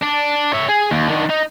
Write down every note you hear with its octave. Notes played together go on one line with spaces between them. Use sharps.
D4
C#5 E5
G#4
D#2
D3 D#3
D#4